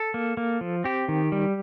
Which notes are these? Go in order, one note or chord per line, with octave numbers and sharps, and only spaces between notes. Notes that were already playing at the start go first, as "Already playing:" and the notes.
Already playing: A4
A#3
A#3
F3
C4 G4
D#3
G3